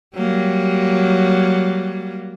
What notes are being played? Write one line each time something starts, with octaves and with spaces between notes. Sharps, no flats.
F#3 G3 A#3